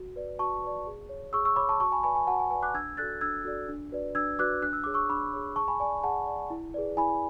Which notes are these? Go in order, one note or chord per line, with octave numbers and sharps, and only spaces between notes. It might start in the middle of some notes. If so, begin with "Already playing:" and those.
Already playing: F#4
B4 D5
F#4 A5 C#6
B4 D5
G#4
C#5
G#4 C#6 E6
C#6 E6
C#5 B5 D6
A5 C#6
F#4 A5 C#6
G#5 B5
B4 D5 G#5 B5
G#5
F#4 F#5 A5
G#5
B4 D5 G#5
D6 F#6
D4 E6 G#6
F#4 A4 D5 F#6 A6
D4 E6 G#6
F#4 A4 D5
D4
F#4 B4 D5
D4 E6 G#6
F#4 B4 D5 D6 F#6
D4 F#6
E6
G#4 C#5 D6
C#6 E6
D4 B5 D6
G#4 C#5
G#4 A5 C#6
G#5 B5
D5 G#5
G#4 F#5 A5
D5
E4
G#4 B4 D5
E4 G#5 B5